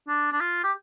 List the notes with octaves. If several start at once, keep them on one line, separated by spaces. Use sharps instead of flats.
D4
D4
F4
G4